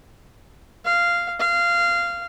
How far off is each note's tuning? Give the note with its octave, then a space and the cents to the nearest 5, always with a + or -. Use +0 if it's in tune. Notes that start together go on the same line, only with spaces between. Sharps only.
F5 -10
F5 -15